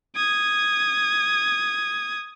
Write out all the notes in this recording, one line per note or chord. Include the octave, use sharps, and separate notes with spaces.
D#6 G#6